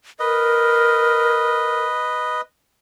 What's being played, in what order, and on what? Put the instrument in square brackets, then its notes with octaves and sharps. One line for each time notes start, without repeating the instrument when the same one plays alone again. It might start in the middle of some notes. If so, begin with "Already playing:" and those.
[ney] A#4 [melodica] B4 D#5